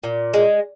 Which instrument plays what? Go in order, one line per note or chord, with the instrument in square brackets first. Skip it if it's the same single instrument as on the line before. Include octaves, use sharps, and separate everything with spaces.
[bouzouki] A#2
G#3